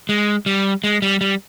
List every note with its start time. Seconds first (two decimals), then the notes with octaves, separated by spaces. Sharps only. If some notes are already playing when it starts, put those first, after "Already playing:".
0.09 G#3
0.46 G3
0.84 G#3
1.02 G3
1.21 G3